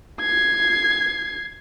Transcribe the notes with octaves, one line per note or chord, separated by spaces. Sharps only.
G#6 C7